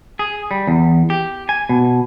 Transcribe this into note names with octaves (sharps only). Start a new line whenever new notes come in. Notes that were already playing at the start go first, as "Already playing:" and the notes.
G#4
G3
E2
G4
G#5
B2